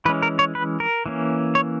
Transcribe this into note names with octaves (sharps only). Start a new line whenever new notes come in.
E3 G#3 C#4 B4
A#4
C#5
B4
A#4
E3 A#3 C#4
C#5